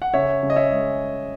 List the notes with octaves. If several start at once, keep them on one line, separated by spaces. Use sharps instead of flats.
F#5
C#3 C#5 E5
C#3
D#5
C#5 E5
G#3